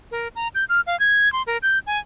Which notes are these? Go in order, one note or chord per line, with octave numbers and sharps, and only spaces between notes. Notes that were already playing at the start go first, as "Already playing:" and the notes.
A#4
A#5
G6
F6
F5
G#6
C6
A#4
G6
G#5